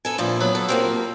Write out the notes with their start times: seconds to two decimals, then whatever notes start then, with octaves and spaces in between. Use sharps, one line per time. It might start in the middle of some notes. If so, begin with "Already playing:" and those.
0.05 B3 A4 G#5
0.18 A#2 D3 F3 E4
0.41 F#3 B3 B5
0.55 A4
0.69 C3 F3 A#3 C4